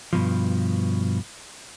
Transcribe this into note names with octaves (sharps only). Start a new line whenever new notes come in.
G2 B2 F3